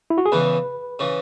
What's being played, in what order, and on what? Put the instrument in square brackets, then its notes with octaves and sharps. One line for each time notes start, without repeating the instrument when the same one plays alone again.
[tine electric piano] E4
F#4
G#4
[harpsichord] E2 C#3 E3 [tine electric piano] B4
[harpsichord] C#3 E3